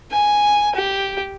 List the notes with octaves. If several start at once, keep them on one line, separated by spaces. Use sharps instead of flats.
G#5
G4